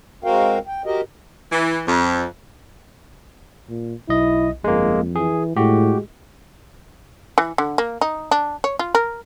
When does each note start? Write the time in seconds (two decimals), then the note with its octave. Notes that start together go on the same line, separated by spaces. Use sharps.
0.24 G#3 C4 F#4 A#4 F5 G5
0.67 G5
0.86 F#4 G4 A#4 D#5
1.52 E3
1.87 F2
3.69 A#2
4.09 B1 E4 D#5
4.64 G1 F2 G#3 A#3
5.16 E3 G#4
5.57 A2 G#3 F#4 G4
7.38 E3
7.58 D3
7.78 A#3
8.01 D#4
8.31 D4
8.64 C#5
8.79 F4
8.95 A#4